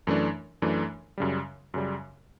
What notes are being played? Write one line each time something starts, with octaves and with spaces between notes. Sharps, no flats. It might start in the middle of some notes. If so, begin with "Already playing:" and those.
F#2 E3 A3 D4
F#2 E3 A3 D4
F#2 C#3 G3
F#2 C#3 G3